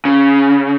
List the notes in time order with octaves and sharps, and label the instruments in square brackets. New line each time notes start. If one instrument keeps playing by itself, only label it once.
[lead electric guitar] C#3